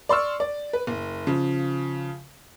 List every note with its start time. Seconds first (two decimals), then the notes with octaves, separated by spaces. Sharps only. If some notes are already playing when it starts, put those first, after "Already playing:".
0.09 D5 C6 C#6 E6 F6
0.40 D5
0.73 B4
0.87 F#1
1.26 C#3 F3